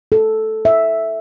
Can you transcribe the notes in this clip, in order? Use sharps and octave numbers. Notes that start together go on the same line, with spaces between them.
A4
E5